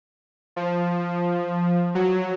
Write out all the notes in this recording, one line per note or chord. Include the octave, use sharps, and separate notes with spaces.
F3
F#3